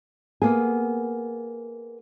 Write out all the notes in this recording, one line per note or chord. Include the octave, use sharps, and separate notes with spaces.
A#3 B3 G#4